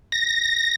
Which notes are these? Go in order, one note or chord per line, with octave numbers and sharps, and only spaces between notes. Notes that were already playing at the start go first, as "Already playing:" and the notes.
A#6